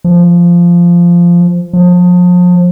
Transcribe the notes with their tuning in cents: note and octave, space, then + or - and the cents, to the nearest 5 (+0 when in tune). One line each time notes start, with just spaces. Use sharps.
F3 -10
F3 +35